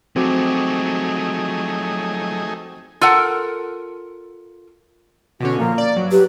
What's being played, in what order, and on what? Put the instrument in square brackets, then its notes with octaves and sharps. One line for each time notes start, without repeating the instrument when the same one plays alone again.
[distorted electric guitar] F3 F#3 [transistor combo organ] A3 D#4 G#4 [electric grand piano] C4 F#4 D6
[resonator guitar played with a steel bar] F4 A4 A#4 F#5
[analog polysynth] B2 D3 C#4 [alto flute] F#4
[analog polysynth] A#2 F3 [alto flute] A#3
[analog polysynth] D5
G2 F#3
[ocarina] G4 [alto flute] B4